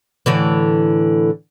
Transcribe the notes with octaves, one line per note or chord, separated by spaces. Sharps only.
A2 D3 E3